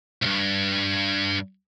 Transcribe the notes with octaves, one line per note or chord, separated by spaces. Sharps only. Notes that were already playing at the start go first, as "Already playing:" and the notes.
C2 G2